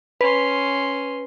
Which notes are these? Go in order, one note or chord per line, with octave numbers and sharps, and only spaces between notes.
C#4 B4 C6